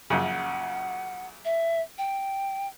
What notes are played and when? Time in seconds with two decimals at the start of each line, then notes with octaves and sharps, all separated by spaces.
0.10 A#1 F#2 C#3 F#5
1.45 E5
1.98 G5